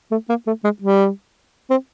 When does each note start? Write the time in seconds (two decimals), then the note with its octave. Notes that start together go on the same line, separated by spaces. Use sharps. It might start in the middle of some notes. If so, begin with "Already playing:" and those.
0.11 A3
0.29 A#3
0.47 A3
0.64 G#3
0.82 G3
1.70 C4